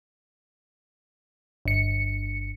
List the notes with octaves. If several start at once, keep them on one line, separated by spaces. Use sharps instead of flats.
G1 C#7